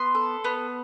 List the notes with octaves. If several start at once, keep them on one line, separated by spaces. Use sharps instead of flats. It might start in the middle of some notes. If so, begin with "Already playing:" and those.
Already playing: B3 C6
A4
B3